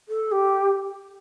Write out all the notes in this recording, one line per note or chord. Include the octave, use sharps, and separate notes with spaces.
A4
G4